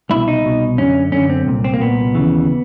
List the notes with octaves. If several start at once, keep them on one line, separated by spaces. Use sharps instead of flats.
C2 B2 E4
D#4
C2 B2
F#2 D3 C#4
F#2 D3 C#4
C4
C2 A#2
C4
A#3
C2 A#2 B3
D#2 C#3 E3